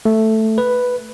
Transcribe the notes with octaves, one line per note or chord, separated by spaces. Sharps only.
A3
B4